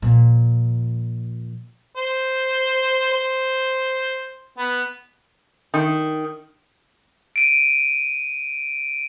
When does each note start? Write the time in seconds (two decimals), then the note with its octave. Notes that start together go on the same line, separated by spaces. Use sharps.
0.02 A#2 F3
1.96 C5
3.12 C5
4.58 B3
5.74 D#3
7.36 D7 D#7